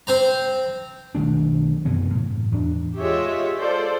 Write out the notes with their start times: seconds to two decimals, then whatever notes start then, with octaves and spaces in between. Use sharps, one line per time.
0.07 C4 C5 A#5
1.15 B1 D#3 A3 D4
1.85 F#2 C3 E3 B3
2.15 A2
2.52 E2 D4
2.98 G#3 F4 G4 G#4 C#5 E5
3.59 F4 A4 C5 D5